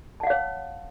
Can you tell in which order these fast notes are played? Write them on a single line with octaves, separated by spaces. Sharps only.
A5 F#5 F5 C#5